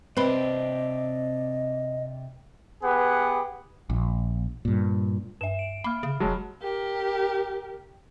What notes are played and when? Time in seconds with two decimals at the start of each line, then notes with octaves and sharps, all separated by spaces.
0.17 C3 C4 D4 G4 B4 D#5 B5
2.83 B3 G4 G#4 B4 F#5
3.90 A#1
4.65 G2 A#2
5.41 G2 E5 E7
5.59 D7
5.84 A#3 B5 F6
6.03 C#3
6.20 F1 F#3 G#3 A5
6.62 G4 A#4